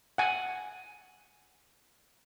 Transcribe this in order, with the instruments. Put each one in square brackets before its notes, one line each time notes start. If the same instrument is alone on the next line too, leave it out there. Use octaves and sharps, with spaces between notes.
[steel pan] F#5 G#5